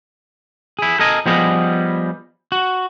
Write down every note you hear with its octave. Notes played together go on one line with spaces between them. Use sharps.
E4 G#4
A4 A#4 D#5 G#5
F3 G3 B3 G#4 D#5
F#4